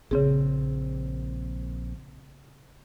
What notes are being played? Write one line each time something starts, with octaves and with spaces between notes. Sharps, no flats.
A#1 C#3 C4 G#4